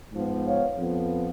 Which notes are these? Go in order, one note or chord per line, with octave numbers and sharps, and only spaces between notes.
G#2 F3 B3
C#5 F5
F2 F3 B3